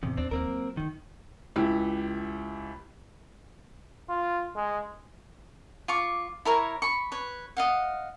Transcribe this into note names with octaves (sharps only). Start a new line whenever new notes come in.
E2 A2 C3
D#2 D#3 C4 D4
D#2 E3 A#3 C4 A#4
F#3
F#1 D#3 G#3
C#2 E4 G4
F4
G#3
F4 C#6 D6
E4 A#4 C#5 A#5
B5 C#6
B4 C#5
D#5 F5 F#5